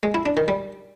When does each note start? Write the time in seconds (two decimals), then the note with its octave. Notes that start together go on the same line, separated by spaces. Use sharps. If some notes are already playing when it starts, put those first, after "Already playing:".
0.03 G#3
0.14 E4
0.26 D4
0.37 D#3
0.48 G3